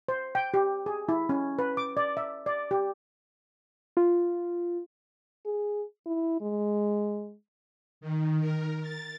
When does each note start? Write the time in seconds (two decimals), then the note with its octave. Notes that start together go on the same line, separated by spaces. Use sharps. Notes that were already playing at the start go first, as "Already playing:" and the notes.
0.08 C5
0.35 G5
0.54 G4
0.86 G#4
1.09 E4
1.29 C#4
1.59 B4
1.77 D6
1.97 D5
2.17 E5
2.46 D5
2.71 G4
3.97 F4
5.46 G#4
6.06 E4
6.41 G#3
8.01 D#3
8.40 A#4
8.82 A6